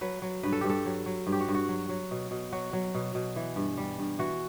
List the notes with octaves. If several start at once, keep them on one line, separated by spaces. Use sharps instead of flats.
F#3 B4
F#3
G2 B4
A4
G2 G4
A4
F#3
F#3
G2
G4
F#4
G2
F#4
F#3
F#3
B2
B2
F#3 F#4
F#3
B2
B2
E3
G2
G3
G2
E3 F#4